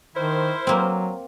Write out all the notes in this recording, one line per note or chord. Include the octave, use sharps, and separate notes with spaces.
D#3 E4 A#4 C5
F#3 A#3 C4